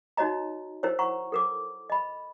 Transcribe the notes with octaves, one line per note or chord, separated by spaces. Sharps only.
D#4 F#4 C#5 D#5 A#5
E4 A#4 C5 C#5
F#5 A#5 C#6
A4 A#4 D6
D#5 B5